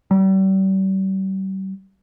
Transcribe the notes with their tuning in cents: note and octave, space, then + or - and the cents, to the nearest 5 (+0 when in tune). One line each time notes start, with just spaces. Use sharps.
G3 -40